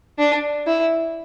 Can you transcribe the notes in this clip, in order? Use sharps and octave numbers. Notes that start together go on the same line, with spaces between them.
D4
E4